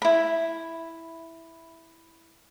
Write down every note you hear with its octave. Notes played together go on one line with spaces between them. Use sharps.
E4 B5